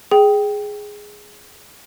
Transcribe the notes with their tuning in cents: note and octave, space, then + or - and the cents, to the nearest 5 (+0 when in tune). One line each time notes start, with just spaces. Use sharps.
G#4 +0 G5 -5